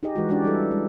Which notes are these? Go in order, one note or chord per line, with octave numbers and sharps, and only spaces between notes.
D#4 G4 G#4 D#5
E3 G#3 F#4
G#3 C#4 D4 F#4 G4 D5
G3 E4 A4
G#3